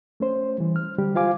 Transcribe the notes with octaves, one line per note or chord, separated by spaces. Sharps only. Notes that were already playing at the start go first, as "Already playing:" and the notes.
A3 C#4 C5
E3 G3
F6
D3 G3 G4
F4 C5 F5 G#5 D6